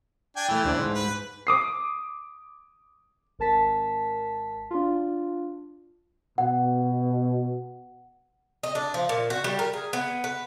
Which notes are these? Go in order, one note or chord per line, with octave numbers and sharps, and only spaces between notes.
D4 G5 G#5
E3 A3 G5
D2 D4 D5
G#2
B4
D6 D#6 C7
G#1 A#4 A5 B6
D4 F4
B2 F#5
D#5
D4
F3
A#2
F#4
G3
A#4
G#4
B3
B4